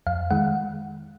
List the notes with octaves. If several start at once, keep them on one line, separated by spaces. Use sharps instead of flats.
F2 F5
D#3 G#3 F#5